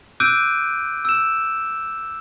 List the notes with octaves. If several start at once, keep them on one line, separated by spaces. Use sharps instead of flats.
D6 E6 F#6 G6 D7 D#7
E6 E7